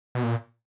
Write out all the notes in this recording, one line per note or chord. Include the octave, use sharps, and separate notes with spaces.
B2
A#2